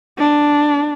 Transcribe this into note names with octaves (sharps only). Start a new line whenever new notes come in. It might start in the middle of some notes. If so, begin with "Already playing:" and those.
D4